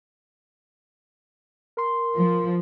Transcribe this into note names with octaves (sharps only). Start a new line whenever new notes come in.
A#4 C6
F3